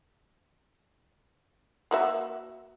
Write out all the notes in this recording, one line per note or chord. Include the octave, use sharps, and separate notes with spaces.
A#3 F#4 E5